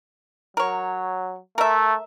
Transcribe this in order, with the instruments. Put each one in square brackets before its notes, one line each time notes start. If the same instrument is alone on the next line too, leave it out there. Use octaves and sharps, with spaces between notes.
[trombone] F#3 [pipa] A#4 C#5
[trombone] A3 [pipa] A#4 E5